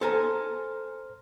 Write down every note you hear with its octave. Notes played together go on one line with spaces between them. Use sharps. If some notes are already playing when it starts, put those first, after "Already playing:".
A4 C5 G#5 A#5 F6